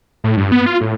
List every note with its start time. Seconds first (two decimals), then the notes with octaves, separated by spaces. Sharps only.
0.24 A2
0.37 G2
0.52 B3
0.66 F4
0.81 A2